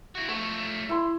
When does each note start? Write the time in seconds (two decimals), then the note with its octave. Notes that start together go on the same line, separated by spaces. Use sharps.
0.15 E4 F#4
0.29 F3 A3 C#6
0.89 E4 C6